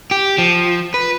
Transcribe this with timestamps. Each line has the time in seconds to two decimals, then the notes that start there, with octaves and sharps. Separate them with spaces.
0.11 G4
0.38 F3
0.94 B4